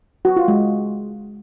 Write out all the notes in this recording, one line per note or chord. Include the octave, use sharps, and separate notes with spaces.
F#4
F4
G#3